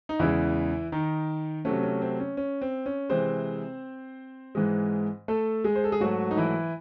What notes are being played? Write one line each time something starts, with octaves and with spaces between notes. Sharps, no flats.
D#4
E2 C#3 E3 G#3 E4
D#3 D#4
C3 F#3 A3 C#4
C#4
C4
C#4
C#4
C4
C#4
C3 E3 G#3 C4 C5
G#2 E3 G#3
A3 A4
G#3 G#4
C5
A4
G#4
G#2 F#3 A3 F#4
D#4
E3 E4